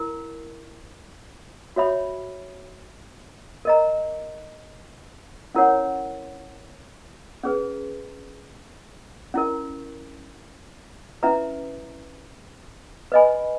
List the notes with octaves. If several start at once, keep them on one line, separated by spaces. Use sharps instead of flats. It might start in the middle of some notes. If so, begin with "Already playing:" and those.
Already playing: E4 A#4
F#4 C#5 E5 B5
A#4 D#5 A#5
C#4 E4 A#4 C#5 F#5
C#4 G#4 B4
C#4 E4 A#4
C#4 E4 B4 E5 A#5
B4 D#5 G#5 B5